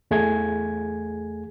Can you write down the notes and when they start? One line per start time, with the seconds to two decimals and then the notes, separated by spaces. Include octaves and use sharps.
0.11 E2 A3 G#4 G#6